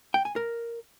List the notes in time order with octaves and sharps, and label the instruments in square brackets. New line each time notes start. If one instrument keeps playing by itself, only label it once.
[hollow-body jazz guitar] G5
G#5
A#4